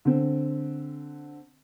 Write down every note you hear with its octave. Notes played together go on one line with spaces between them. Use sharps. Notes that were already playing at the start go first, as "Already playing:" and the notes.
D3 C4